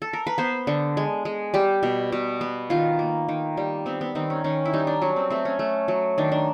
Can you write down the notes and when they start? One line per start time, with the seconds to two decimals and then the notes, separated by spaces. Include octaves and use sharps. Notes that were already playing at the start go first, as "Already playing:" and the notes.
0.02 A4
0.13 A#4
0.27 B4
0.38 B3 C5
0.67 D3
0.97 G#3
1.25 G#3
1.54 G3 G4
1.83 B2
2.12 B2
2.41 B3
2.70 D#3 F4
2.99 A#3
3.28 D#3
3.57 G3
3.86 B3 C4
4.01 B3
4.15 D#3 C4
4.30 C#4
4.44 D#3 C#4
4.65 E4
4.73 G3 D#4
4.87 D4
5.02 F#3 C#4
5.16 C4
5.30 A3 C4
5.45 C#4
5.59 A3
5.88 F#3
6.18 D#3 D4
6.32 D4